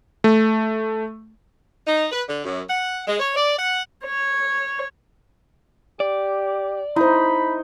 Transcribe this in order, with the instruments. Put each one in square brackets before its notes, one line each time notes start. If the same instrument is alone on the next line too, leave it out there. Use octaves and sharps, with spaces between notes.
[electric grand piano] A3
[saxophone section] D#4
B4
D3
F#2
F#5
G#3
C#5
D5
F#5
[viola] C#5
[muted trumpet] G4 [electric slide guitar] D5
[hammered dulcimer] D#4 [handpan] E4 C5 [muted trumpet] B5